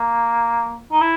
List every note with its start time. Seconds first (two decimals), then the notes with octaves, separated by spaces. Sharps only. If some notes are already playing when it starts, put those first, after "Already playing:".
Already playing: A#3
0.91 D#4
1.01 E4